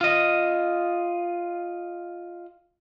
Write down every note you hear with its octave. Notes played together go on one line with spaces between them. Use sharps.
F4 D#5